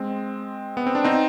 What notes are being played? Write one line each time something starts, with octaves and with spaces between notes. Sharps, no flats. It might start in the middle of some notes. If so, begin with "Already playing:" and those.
Already playing: G#3 C4
B3
C4
D4
C4 D#4